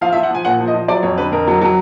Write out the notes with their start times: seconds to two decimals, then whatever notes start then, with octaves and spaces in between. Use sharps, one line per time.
0.01 F3 F5
0.12 E5
0.16 F3
0.23 F#5
0.31 F3 G#5
0.45 A#2 F#5
0.60 F3
0.67 D#5
0.74 F3
0.88 F#3 D5
1.03 F2 C#5
1.18 D3 B4
1.32 F2 A#4
1.47 F#3
1.61 F#3